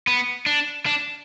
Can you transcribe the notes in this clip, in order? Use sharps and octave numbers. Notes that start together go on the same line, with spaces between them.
B3
D4
D4